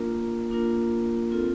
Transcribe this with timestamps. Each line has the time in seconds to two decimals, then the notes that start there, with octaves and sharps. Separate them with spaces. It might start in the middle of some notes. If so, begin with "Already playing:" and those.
Already playing: A#3 D4 F4 A#4
0.50 A#3 D4 F4 A#4
1.31 C4 F4 A4